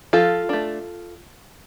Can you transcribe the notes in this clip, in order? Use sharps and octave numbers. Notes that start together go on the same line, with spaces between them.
F3 F4 A4
A3 D4